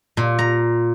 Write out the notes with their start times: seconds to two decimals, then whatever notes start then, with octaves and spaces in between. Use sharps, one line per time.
0.17 A#2
0.39 A#5